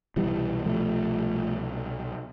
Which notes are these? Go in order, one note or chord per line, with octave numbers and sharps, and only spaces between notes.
C2 B2 E3 G3
F3 A3